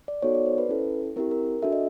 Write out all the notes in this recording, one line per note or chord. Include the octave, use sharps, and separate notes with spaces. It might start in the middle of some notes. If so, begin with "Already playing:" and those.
D5
B3 D#4 F#4 A4 C#5
D5
C5
B4
C#4 E4 A4
C4 E4 G4 A#4
A#4
D4 F#4 A4 E5
D#5